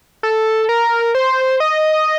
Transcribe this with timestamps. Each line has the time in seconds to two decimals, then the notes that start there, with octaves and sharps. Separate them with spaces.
0.23 A4
0.69 A#4
1.15 C5
1.60 D#5